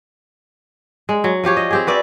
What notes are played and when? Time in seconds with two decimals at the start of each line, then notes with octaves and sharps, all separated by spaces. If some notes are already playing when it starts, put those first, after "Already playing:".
1.09 G#3
1.24 F#3
1.44 F3 F4 G4 C#5
1.57 D#5
1.71 C4 G4 G#4
1.87 F#4 B4 D5 E5